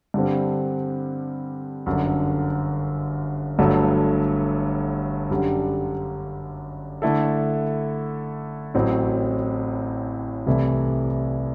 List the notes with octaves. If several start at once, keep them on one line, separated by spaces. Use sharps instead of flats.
G2 D3 G3 C4
G1 F#2 D3
G1 G2 F#3 A3
F#2 D3 G3
D3 A3 E4 A4
A1 A2 F#3 C4
C2 C3 E3 A3 E4